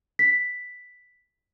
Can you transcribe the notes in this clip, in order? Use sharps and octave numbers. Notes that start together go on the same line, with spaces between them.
B6